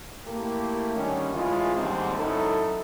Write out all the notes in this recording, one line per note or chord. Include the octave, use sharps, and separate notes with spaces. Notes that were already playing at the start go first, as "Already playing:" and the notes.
A3 A#3 E4 G4 A4 A#4
D3 D#3 G3 C#4
E3 G#3 A3 C#4 E4 F4
D#2 G#2 D3 D#3 G3 C4
F#2 D#4 E4 A4